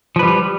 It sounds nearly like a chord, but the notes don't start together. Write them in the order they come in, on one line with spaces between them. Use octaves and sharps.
F3 B4 G3